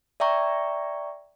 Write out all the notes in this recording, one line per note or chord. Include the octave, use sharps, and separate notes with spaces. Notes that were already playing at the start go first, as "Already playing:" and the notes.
D5 E5 G5 A#5 C#6